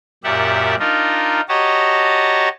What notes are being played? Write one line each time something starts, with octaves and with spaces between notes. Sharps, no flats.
F#2 A#2 G4 D5 E5 F#5
D4 D#4 F4 A#4
F#4 G4 C#5 D#5 A5 A#5